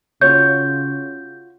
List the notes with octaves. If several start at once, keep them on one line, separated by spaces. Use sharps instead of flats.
C#3 F4 F#4 C#5 G6